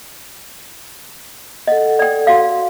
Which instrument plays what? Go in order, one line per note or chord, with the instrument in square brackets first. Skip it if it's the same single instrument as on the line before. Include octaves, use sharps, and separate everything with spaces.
[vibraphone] A4 F#5 [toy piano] D#5
[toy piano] D5 G5
F#4 F5